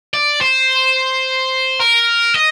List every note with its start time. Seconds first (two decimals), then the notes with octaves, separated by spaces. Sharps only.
0.14 D5
0.41 C5
1.80 A#4
2.34 D#5